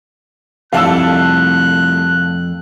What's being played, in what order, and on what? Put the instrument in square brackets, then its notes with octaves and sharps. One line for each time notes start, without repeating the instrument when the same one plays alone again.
[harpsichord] C2 A3 F#5 [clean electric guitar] F2 [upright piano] F5 A5 E6 [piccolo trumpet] F#6